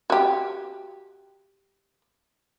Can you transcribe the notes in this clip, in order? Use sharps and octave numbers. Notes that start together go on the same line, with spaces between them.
F#4 G4